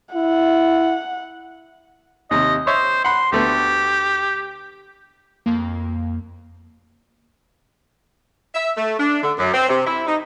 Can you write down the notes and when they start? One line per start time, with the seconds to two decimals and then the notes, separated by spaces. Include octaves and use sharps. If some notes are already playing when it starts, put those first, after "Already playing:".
0.14 E4 F#5
2.31 D#2 C3 D#5
2.67 C5 C#5 D#5 E5
3.04 F#5 B5 C6
3.32 D2 A3 B3 G4
5.46 F2 A#3
8.55 E5
8.77 A3
8.99 D4
9.22 D3
9.38 F#2
9.54 C4
9.69 C3
9.86 E4
10.07 D#4